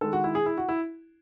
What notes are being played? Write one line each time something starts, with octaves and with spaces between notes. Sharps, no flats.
D#3 G#3 A4
F#4
E4
G#4
E4
F#4
E4